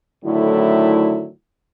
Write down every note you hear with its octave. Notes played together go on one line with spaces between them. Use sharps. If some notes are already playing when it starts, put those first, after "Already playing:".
A2 D3 D#3 F#3 A3 E4